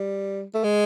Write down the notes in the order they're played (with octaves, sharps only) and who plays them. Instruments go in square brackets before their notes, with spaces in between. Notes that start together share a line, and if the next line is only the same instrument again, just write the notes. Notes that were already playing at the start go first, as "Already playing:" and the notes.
Already playing: [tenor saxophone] G3
A3
G#3